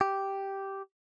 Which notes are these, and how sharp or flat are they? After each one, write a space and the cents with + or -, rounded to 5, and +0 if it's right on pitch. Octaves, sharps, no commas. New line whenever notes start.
G4 -5